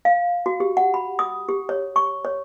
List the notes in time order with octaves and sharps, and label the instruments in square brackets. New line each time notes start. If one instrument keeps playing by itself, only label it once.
[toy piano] F5
F#4
G4
F#5
B5
D#6
G4
C#5
C#6
C#5